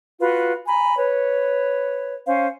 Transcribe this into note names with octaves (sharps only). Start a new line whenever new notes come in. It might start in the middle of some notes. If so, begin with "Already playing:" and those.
F4 F#4 B4
G#5 A#5 B5
B4 C#5
C#4 C5 F5